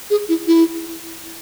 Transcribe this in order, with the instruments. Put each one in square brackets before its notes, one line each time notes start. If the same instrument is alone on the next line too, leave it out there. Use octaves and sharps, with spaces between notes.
[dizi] G#4
E4
E4